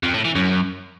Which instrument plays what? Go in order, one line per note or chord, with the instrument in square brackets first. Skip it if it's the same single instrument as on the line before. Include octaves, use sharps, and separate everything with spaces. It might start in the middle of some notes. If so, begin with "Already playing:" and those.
[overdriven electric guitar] F2
A2
E3
F#2